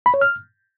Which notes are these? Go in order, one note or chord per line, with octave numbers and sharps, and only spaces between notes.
B5
C#5
F6